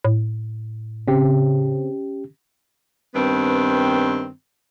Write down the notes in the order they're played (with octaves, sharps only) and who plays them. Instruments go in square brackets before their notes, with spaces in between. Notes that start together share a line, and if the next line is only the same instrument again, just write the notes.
[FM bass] A2
[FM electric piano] C#3 C4 [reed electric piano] C#4 G4
[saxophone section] G2 D#3 B3 C4